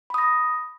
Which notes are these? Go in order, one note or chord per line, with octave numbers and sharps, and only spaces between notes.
B5 D#6 A#6